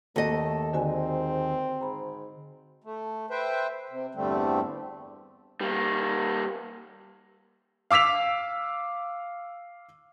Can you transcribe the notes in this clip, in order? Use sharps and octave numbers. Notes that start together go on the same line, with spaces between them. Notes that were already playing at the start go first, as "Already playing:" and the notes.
D#2 A3 A4 D#5
G#2 D3 C4 F#4 G#5
G#2 A#5 B5
A3
B4 C5 E5 G5
C3
E2 G2 D3 G3 A3 C4
G3 A#3
F5 D6 E6 B6 F7